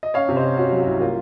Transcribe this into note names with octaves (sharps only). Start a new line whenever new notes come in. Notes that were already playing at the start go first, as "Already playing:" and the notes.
D#5
C#4 C#5 F5
C3
C5 D#5
C#4
C#4 F#4
F#3
F#4
C2
A#3 F4